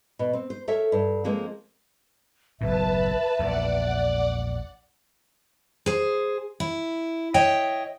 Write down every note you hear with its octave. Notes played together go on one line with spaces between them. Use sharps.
B2
C4
C5
A4 A#4 C#5 E5
G2
F3 G#3 A#3 C4
F#1 B1 A2 B4 E5 A5
A#1 E2 D5 F#5
G#4 C5
E4
C#5 D#5 E5 G5